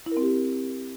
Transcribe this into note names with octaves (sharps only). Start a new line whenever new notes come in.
E4
A#4
C4
G4